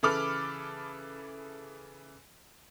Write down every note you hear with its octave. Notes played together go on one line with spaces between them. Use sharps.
C#3 E3 A4 B5 D6 F6